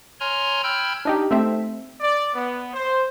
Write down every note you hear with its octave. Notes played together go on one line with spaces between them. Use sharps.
C#5 G#5 A#5 C6 F6
G5 B5 E6 F6 G6 G#6
D4 D#4 G4
A3 C4 E5
D5
B3
C5